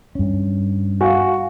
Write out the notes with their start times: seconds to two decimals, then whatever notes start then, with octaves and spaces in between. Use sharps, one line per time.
0.15 G2 C#4
1.01 F#4 F5 G#5